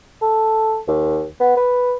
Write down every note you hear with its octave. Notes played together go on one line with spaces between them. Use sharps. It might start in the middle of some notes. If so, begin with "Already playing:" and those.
A4
D#2
B3
B4